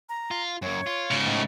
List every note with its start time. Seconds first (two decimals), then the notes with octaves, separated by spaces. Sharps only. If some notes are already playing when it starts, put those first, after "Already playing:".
0.09 A#5
0.31 F4
0.62 F#2 A#3 C#5
0.87 F4
1.11 G#2 C#3
1.27 A2